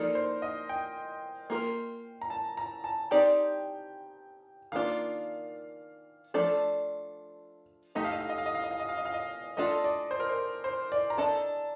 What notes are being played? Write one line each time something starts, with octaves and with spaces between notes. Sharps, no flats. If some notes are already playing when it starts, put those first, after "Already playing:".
Already playing: F3 A#3 D#4 A4 A#4 D5
C5
D#5
G5
A#3 F4 A#4
A#5
A5
A#5
A5
C4 D#4 G4 D5 G5
D#3 A#3 D4 F4 F5
F3 A3 D4 A4 D5
A3 D#4 G4 D#5
F5
D#5
F5
D#5
F5
D#5
F5
D#5
F5
D#5
F5
D#5
F5
D#5
A3 D4 F4 A4 D#5
D5
C5
A#4
C5
C5
D5
A#5
D4 A4 D#5 A5